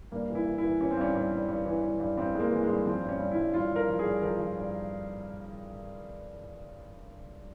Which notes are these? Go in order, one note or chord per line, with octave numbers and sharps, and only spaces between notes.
G2 A#3
E3
E4
E3
E4
E3
E3 C#4
C4
G2 C#4
G2
G2
G2
E3
G2
G2
G2 C4
G2 G#3
A#3
E3
G#3
G2
F3 C4
G2
C#4
G2
E4
G2
G2 F4
G2 A#4
F3
G#4
G2
F3 A#4
F3
G2